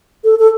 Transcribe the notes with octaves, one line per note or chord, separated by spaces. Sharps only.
A4
A4